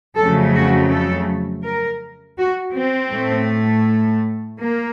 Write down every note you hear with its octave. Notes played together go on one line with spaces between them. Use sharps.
F2 C#3 F#3 A3 A4
F#4
A4
A#4
F#4
C4
A2 A3
A#3